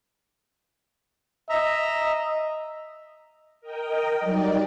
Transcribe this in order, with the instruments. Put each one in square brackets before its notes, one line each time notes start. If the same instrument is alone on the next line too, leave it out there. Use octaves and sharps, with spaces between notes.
[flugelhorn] D#5 [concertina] E5 A#5
[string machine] A#4 D#5 G5
F#3 G3 D#4 G4 D5